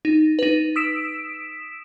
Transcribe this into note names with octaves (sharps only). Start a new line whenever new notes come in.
D#4
D#4 B4
D#6 E6 B6 D7 E7